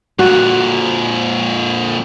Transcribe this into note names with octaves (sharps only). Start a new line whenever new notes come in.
F2 A#2 F#4